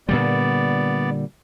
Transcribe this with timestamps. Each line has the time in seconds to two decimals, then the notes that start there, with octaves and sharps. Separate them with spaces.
0.09 A#2 D3 G3 B3 D5